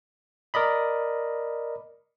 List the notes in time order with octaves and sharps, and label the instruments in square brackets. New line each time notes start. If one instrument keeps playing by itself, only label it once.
[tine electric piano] A#4 D5 D#5 B5